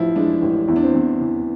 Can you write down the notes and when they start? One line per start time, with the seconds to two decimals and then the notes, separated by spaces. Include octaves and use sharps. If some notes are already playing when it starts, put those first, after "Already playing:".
Already playing: A1 F3 E4
0.16 G#3 D4
0.42 A1
0.68 E2 E4
0.76 D4
0.83 C4
0.91 E2 D4
1.21 E3